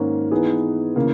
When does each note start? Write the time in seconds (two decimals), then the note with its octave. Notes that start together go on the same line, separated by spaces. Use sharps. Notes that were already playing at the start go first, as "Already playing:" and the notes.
Already playing: G#2 D#3 A#3 C#4
0.31 E3 B3 D#4 G#4
0.96 C#3 E3 A#3